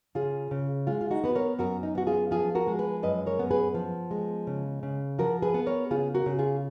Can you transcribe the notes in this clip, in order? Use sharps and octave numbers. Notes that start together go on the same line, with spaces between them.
C#3 F4 G#4
C#3
G#3 F4
F4
D#4 F#4
B3 B4
A#4 C#5
F#2 F#4 A#4
D#4
B3 F#4
F4 G#4
F3 F4 G#4
F#4 A#4
G#3
G#4 B4
F#2 B4 D#5
A#4 C#5
B3
G#4 B4
F3
G#3
C#3
C#3
F3 F#4 A#4
G#4 B4
B3
A#4 C#5
C#3 F4 G#4
F#4 A#4
C#3
F4 G#4